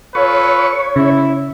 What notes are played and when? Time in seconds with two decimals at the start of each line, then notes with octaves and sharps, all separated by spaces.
0.15 F4 A4 B4 C#5
0.96 C#3 E4